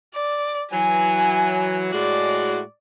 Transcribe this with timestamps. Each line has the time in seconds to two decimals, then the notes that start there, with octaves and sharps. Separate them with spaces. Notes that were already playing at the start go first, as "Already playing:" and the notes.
0.15 D5
0.72 E3 F#3 G#5
1.93 A2 G#3 F#4 D5